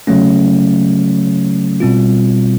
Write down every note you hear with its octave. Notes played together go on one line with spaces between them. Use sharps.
C#3 F#3 A3 C#4
B2 G3 C4 F4